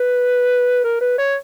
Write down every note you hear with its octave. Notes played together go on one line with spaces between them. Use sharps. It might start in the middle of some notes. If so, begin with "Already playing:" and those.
Already playing: B4
A#4
B4
C#5